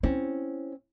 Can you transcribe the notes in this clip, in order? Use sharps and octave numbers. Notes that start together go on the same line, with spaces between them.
C4 C#4 E4